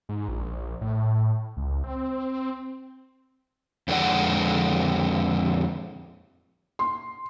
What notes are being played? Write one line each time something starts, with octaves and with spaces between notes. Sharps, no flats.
G#2
A#1
A2
C#2
C4
F2 D3 G#3 C#4 D5 F#5
C6